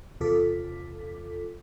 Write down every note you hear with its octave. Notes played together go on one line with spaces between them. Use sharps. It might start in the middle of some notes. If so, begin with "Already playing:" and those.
E2 C3 F4 A4 D6 B6